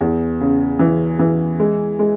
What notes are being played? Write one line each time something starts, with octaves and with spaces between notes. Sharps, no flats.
E2
C#3
E3
E3
G#3
G#3